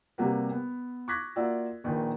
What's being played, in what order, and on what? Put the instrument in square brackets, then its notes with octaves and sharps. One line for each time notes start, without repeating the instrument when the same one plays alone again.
[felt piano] C3 G3 A#3 F#4 B4
B3
C#6 D6 F#6 G#6 A#6 B6
A#3 F4 F#4 D5 E5
A#1 A#2 D#3 A#3 B4